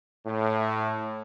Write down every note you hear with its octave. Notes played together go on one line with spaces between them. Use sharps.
A2